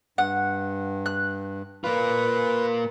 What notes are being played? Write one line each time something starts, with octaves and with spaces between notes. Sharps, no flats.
G2 F#5
F#6
A#3 F4 B4